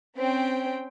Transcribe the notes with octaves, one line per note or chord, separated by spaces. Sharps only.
C4 C#4 G5